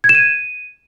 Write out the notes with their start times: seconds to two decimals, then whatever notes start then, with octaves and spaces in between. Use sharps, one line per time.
0.04 G#6
0.09 E7
0.15 D#7